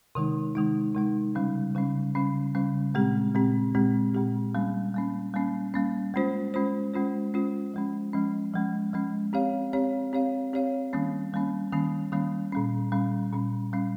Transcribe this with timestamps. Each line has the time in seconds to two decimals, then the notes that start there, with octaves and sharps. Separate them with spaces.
0.15 C3 D#3 G#3 D#4
0.55 C3 D#3 G#3 D#4
0.95 C3 D#3 G#3 D#4
1.35 C#3 G3 C#4
1.75 C#3 G3 C#4
2.15 C#3 G3 C#4
2.55 C#3 G3 C#4
2.94 A#2 G#3 C4 G4
3.35 A#2 G#3 C4 G4
3.75 A#2 G#3 C4 G4
4.14 A#2 G#3 C4 G4
4.55 G3 A#3 C#4
4.94 G3 A#3 C#4
5.34 G3 A#3 C#4
5.74 G3 A#3 C#4
6.14 G#3 C#4 F4 C5
6.54 G#3 C#4 F4 C5
6.94 G#3 C#4 F4 C5
7.34 G#3 C#4 F4 C5
7.74 F3 G#3 C#4
8.13 F3 G#3 C#4
8.54 F3 G#3 C#4
8.93 F3 G#3 C#4
9.33 C4 G4 C#5 F5
9.73 C4 G4 C#5 F5
10.13 C4 G4 C#5 F5
10.53 C4 G4 C#5 F5
10.93 D#3 G3 A#3 C#4
11.33 D#3 G3 A#3 C#4
11.73 D#3 G3 A#3 C#4
12.12 D#3 G3 A#3 C#4
12.52 A#2 G3 C#4
12.92 A#2 G3 C#4
13.32 A#2 G3 C#4
13.72 A#2 G3 C#4